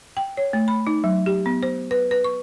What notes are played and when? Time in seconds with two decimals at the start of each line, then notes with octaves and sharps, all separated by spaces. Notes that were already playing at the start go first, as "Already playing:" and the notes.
0.17 G5
0.37 C#5
0.53 A3
0.68 B5
0.87 D#4
1.04 F#3
1.26 G4
1.46 B3
1.63 C5
1.91 B4
2.11 B4
2.24 C#6